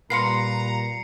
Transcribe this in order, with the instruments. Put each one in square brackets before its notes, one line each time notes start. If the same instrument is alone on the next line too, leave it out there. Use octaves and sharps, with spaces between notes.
[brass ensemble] A#2 G3 [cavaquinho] B4 F5 C6 [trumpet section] A#5 [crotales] C7 C#7